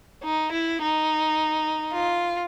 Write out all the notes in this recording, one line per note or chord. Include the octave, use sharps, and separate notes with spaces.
D#4
E4
D#4
F4